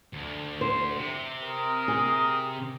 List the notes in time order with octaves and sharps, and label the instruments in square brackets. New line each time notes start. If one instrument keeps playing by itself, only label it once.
[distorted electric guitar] D2
[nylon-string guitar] C5
[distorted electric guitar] C3
[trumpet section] A#4 D#6
[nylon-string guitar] G#4